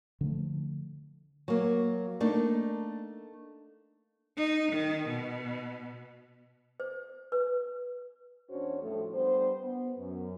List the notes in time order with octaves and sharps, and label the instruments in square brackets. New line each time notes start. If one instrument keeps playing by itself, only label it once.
[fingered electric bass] D3 F3 A3
[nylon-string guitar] F#3 A#3
A3 A#3 D4 D#4
[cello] D#4
D#3
B2
[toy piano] C5
B4
[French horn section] E2 C#4 D4 F#4 C5 C#5
A2 F3 G3 A3
G3 B3 D4 C5
B3
F#2